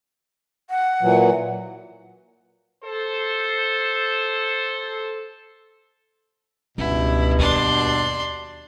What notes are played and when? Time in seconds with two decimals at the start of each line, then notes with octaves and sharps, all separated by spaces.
0.70 F#5
1.02 A#2 E3 F#3
2.84 A4 C5
6.78 C#2 G2 B2 E4
7.38 D#2 D4 C6